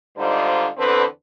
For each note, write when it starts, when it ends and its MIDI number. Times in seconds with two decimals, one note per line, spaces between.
0.18 0.68 44
0.18 0.68 50
0.18 0.68 55
0.18 0.68 63
0.18 0.68 65
0.18 0.68 72
0.78 1.05 40
0.78 1.05 50
0.78 1.05 60
0.78 1.05 69
0.78 1.05 71